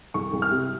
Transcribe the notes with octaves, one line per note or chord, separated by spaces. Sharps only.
C2 C#6
C2
F6
C3